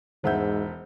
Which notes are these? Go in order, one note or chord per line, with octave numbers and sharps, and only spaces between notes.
E1 G#2 C5 E5 F#5 G6